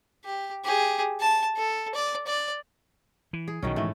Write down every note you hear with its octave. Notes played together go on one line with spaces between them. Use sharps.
G4
G4 G#4
A5
A4
D5
D5
E3
G#4
B1 B2 D#3 E3 C#4
G#2 E3 F3 A3 E4